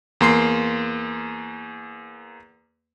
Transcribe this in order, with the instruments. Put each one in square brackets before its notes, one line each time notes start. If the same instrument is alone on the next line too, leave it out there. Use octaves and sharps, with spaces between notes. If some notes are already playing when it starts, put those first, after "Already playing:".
[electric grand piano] E2 A#3 C6 C7